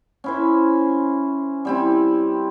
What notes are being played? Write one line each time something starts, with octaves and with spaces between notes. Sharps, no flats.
C#4 E4 C5
G3 C4 E4